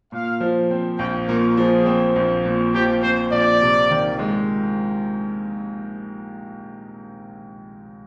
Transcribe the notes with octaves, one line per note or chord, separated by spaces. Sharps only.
A#2 F5
F3
C4
A#1 G5
A#2 A#4
F3 G#4
C4
A#1
A#2
F3 G4
C4 C5
A#1 D5
C3
D#3
G#3